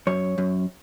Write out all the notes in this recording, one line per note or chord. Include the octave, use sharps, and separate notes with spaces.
F#2 C#5
F#2